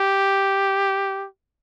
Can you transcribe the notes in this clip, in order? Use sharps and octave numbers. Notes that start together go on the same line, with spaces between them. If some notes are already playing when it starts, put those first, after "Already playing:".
Already playing: G4